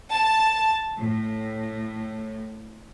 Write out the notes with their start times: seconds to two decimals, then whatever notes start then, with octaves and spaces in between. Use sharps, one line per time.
0.12 A5
0.98 A2